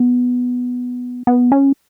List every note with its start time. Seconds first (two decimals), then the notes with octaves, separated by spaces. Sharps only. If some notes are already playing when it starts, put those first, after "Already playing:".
Already playing: B3
1.27 B3
1.52 C#4